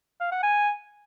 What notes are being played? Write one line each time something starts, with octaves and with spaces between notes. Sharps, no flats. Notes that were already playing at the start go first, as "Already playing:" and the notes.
F5
F#5
G#5